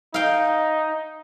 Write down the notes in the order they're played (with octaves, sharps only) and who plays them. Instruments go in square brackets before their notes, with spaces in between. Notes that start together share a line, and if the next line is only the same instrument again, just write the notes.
[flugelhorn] D#4 [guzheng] F5 G5